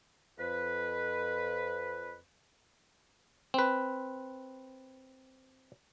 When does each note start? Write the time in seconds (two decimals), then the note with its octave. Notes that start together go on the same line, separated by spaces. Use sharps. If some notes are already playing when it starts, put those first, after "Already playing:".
0.39 F2 B4
3.54 C4 B4